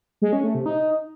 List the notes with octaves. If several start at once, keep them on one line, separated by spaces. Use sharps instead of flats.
G#3
C#4
A3
C3
D#4